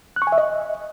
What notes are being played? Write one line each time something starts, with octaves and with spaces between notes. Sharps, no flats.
F#6
C#6
G#5
E5
D#5